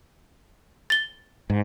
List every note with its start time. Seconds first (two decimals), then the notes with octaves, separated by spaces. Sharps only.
0.90 A6 G7
1.50 G#2